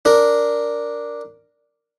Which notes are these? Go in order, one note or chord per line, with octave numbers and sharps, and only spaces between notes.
D4 A#4